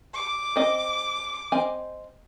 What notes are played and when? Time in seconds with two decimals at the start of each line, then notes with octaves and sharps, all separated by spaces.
0.14 D6
0.56 C4 D#5
1.52 C4 D#5 G#5